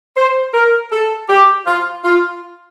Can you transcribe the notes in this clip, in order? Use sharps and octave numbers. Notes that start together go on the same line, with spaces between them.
C5
A#4
A4
G4
F4
F4